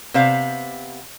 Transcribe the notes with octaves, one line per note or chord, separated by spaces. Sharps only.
C3 B3 C5 F5